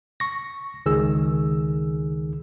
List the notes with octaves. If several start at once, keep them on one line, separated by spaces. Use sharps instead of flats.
C#6 A#6
C#2 D#3 G#4 E6